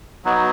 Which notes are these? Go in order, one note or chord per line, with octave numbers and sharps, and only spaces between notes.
F#3 B3 D#4 F#4